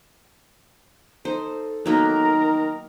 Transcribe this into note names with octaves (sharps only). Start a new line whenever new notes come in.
D#4 A4 C5
D#3 F#3 A#3 B3 A#4 A#5